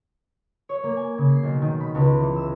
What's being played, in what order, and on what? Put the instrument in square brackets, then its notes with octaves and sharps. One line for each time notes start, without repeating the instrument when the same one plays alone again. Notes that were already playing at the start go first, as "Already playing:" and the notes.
[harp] C#5
A#3
G#5
C#3
C7
B1
D#3
B5
C#2
E3
E6